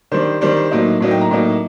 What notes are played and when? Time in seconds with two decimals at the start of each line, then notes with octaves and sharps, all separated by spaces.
0.11 D#3 G3 D4 C5
0.41 D#3 G3 D4 C5
0.57 C5
0.71 A2 F#3 A#3 D#4
1.01 A2 F#3 A#3 D#4
1.11 G5
1.21 A#5
1.31 A2 F#3 A#3 D#4